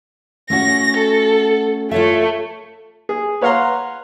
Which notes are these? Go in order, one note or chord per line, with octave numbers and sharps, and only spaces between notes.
A3 C#4 F#4 A#6
A4
A3 F4 C#5 E5
G#4
B4 C#5 F5 F#5 A#5 C6